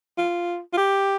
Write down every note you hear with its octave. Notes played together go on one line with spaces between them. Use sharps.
F4
F4
G4